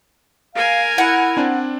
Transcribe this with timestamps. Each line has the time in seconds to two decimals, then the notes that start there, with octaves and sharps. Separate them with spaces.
0.55 A#4 F5 G#5
0.98 E4 F#5
1.37 C4 D4 D5